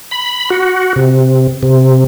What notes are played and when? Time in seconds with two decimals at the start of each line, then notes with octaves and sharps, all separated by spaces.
0.11 B5
0.50 F#4
0.96 C3
1.63 C3